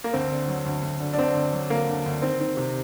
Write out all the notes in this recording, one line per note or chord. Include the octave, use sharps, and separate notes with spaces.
A#3
D2 C4
D3
F#3
D2
D2
D3
D4
D2 C4
D2
F#3
D3 A#3
D2
D2
D#3 C4
D#3
C3